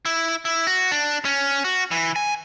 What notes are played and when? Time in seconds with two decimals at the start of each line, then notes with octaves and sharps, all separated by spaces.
0.05 E4
0.45 E4
0.67 F#4
0.91 D4
1.25 C#4
1.65 F#4
1.91 E3
2.16 G#5